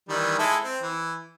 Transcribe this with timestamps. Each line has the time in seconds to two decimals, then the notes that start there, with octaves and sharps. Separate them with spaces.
0.09 D#3 E3 G3
0.39 G#3 E4 A4
0.63 C4
0.82 E3